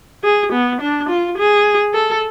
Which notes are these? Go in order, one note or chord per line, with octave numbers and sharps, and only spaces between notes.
G#4
B3
D4
F4
G#4
A4